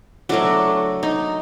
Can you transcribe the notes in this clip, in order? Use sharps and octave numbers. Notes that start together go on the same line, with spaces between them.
F#3 A3 D4 F#4
D#4